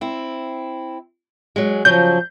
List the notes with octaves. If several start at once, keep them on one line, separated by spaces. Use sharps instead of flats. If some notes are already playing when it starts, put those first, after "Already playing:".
C4 E4
F#3 G#3
C#3 F3 F#3 G6